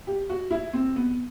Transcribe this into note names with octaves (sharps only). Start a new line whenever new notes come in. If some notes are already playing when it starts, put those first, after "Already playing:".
G4
F#4
E4
C4
B3